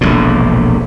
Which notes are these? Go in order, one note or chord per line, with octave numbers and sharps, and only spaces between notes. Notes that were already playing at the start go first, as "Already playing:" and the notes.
E1 A#1 A2